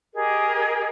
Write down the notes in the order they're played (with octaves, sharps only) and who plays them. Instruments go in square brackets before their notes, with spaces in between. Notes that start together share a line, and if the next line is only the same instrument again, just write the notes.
[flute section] G4 G#4 A#4 D#5